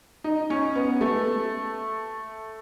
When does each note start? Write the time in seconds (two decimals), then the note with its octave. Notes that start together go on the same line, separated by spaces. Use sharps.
0.24 D#4
0.50 C#4
0.75 B3
1.01 A3